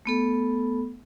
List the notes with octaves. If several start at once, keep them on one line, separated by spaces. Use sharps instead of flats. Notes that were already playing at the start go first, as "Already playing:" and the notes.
A3 B3 A4